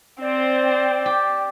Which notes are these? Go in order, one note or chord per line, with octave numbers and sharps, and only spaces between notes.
C4 C5 D5 G5
G4